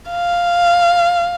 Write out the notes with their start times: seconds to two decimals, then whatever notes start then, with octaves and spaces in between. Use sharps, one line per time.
0.10 F5